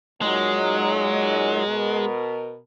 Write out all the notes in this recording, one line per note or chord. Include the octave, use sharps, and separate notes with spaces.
A#2 F#3 G#3 D#4
B2 A#4